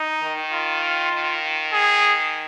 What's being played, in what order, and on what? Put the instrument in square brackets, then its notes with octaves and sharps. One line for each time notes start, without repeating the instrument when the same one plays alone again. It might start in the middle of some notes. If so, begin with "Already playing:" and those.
Already playing: [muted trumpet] D#4
[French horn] D#3
[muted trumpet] F4
[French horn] D#3
[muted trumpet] G#4